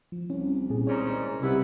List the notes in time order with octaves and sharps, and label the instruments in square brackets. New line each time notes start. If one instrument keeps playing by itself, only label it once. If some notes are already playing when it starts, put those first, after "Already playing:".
[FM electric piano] F3
[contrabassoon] C2 [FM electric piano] C#4
[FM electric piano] A#2 G#4
[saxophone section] G#2 D#3 C#4 [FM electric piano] C#5 D5 A#5
[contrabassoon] C2 [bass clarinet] C3 [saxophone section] B3 E4